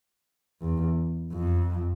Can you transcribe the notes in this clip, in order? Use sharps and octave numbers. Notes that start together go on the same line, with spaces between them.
E2
F2